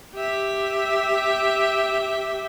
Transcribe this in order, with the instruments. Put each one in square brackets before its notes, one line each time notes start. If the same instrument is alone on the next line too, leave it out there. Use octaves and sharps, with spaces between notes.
[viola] G4 E5